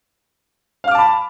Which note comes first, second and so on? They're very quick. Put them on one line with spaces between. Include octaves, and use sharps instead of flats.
F5 F6 D6 A5 B5